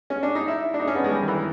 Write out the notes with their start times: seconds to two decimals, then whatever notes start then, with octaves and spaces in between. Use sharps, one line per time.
0.10 C#4
0.23 D4
0.35 D#4
0.48 E4
0.74 D4
0.79 D#4
0.87 C#4
0.96 B3
1.04 G#3
1.11 G3
1.22 D#3
1.28 E3